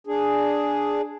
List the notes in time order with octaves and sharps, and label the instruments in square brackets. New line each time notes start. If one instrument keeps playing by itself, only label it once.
[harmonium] D4 G#4